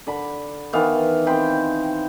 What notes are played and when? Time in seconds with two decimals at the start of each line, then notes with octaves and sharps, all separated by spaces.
0.07 D3 B5
0.73 D#3 E3 B3 F5
1.26 C4 G5 B5 C6